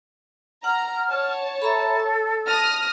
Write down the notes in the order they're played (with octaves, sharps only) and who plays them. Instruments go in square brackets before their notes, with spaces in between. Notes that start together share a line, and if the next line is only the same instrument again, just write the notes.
[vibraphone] F#5 [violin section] A#5 [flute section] F6
[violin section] C#5 A5
[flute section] A4 [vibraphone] E5 A#5 B5
[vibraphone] E6
[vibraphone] A5 [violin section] D#6 F6 A#6